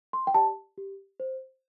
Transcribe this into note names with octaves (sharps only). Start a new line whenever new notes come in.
C6
G5
G4 D5 A5
G4
C5